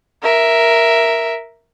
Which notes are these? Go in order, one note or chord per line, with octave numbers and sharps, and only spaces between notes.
A#4 E5